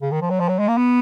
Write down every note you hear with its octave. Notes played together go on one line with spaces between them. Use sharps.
C#3
D#3
F3
F#3
F3
F#3
G#3
A#3
B3